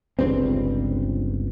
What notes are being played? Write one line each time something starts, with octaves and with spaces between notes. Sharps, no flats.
G1 C#2 G2 C4